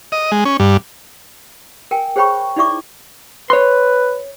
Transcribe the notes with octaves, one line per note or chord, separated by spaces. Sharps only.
D#5
G#3
C#4
G2
A#4 G5 G#5
G#4 C5 C#5 G5 B5 C#6
D#4 E4 D5 E5 C#6 D6
B4 C#5 C6